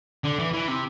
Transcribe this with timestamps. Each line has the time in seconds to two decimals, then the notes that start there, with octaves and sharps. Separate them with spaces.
0.24 D3
0.39 E3
0.53 E3
0.68 C3